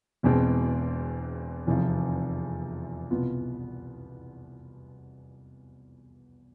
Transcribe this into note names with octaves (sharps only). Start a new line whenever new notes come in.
E1 E2 B2 G#3 C4
F1 E2 C3 F3
C2 B2 B3 F4